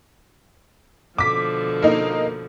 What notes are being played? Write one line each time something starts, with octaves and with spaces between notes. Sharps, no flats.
B2 D3 F3 D6 B6
A#3 D#4